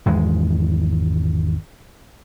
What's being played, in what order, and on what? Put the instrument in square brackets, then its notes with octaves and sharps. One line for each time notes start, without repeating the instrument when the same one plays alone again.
[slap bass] G#1 E2 G#3